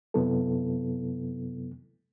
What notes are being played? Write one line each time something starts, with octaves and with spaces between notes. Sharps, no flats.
F#2 C3 F#3 B3 E4 A4